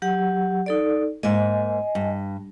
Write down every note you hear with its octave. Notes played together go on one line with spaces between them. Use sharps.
F#3 G4 F#5
D#4 A4 D5
G#2 A#3 D#5 G#5
G2